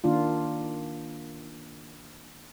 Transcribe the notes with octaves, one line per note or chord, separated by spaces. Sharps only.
D#3 A#3 D4 F4